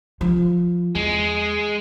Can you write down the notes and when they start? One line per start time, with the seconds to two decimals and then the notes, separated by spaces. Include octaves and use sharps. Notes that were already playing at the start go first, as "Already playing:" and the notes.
0.21 F3
0.95 E2 G#3